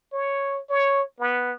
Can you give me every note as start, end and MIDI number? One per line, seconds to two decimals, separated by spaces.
0.13 0.60 73
0.70 1.02 73
1.20 1.53 59